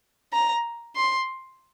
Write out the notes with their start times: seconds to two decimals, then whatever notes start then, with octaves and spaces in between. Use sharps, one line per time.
0.33 A#5
0.96 C6